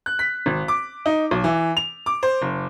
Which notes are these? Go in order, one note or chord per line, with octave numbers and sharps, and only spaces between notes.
F#6
B6
G#1
D6
D#4
B1
E3
F7
D6
C5
F#1